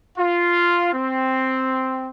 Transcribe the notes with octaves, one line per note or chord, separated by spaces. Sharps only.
F4
C4